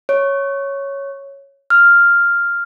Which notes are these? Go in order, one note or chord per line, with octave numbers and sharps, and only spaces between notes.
C#5
F6